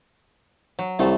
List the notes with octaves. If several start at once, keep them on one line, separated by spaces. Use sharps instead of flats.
F#3
C2 F3 A3